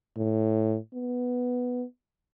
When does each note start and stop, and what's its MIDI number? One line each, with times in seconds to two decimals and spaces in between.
0.17 0.77 45
0.94 1.84 59